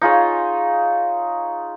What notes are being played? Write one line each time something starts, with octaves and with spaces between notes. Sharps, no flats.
D#4 F4 G#4 C#5